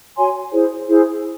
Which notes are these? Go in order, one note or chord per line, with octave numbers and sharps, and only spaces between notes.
F#4 C#5 G#5 C6
E4 G#4 C5
E4 G#4 C5